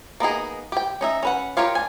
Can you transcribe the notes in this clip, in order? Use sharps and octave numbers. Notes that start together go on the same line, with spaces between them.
A#3 B3 D#4 G#4
G4 G5
C#4 D#4 E5
C#4 B4 F#5
F4 G4 A#4 C#5 F5
D4 G#5